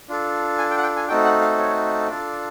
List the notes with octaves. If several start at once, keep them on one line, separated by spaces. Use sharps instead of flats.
D4 F4 A4
G#5
G5
F#5
G5
G#5
A3 C4 D#4 F#4 A4 G5
F#5
F5
C#5
D4 F4 A4 D5